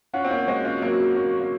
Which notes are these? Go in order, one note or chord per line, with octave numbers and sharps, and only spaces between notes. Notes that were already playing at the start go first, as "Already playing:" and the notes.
C#4 F4 F#4
C4
A#3 C#4
G#3 C4
C#4 F4
F#3 A#3
A#3 C#4
A#3